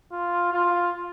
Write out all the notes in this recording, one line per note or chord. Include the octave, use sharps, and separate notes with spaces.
F4
F4